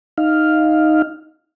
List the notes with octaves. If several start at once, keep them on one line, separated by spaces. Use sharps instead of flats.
D#4 F5